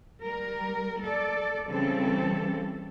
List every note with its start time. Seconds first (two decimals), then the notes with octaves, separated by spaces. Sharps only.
0.22 G3 A#4
1.04 A4 D5
1.67 C#3 E3 G3 C4 A4